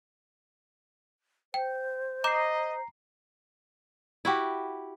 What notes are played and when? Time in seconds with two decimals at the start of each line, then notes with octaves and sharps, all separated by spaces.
1.54 C5 G5
2.24 D#5 A#5 D6 G6 C7 E7
4.25 E4 F#4 G4